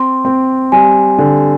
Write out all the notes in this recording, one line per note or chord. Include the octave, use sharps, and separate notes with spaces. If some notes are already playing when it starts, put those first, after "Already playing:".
Already playing: C4 C6
C4
G3 G#5
D3